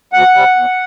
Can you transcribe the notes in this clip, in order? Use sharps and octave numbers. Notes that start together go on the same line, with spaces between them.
D2 F#5
C3 G3
E2